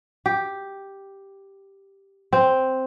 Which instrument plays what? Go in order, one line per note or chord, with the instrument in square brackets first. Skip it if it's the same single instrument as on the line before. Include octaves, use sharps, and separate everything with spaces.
[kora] G4
C4